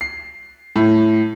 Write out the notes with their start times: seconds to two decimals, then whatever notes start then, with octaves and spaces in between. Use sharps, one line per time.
0.01 C7
0.76 A2